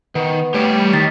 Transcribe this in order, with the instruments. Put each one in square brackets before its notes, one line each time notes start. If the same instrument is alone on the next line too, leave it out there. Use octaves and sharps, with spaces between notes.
[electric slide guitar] D#3 [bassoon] B3
[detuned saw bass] G3 [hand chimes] A3 [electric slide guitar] G4 C#5 G5
[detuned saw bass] D#3 [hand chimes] A6 B6